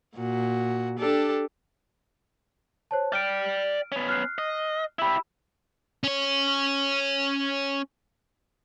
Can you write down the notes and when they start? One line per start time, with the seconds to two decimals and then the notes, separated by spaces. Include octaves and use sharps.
0.15 A#2 F#4
0.99 D4 G4 A4
2.91 C5 C#5 A5
3.12 D5 G5 F6 D7
3.92 B3 C#4
4.09 F6 F#6 C7
4.38 D#5
4.99 E4 G4 B5 E6
6.04 C#4 C#5